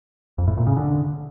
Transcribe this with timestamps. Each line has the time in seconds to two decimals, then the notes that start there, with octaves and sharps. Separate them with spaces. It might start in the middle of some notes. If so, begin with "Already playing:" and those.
0.38 F2
0.48 A2
0.57 A#2
0.67 C#3
0.76 D3